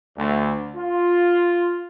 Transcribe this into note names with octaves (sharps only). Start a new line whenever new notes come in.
D2
F4